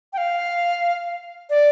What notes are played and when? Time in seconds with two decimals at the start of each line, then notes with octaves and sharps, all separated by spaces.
0.13 G5
0.18 F5
1.50 D5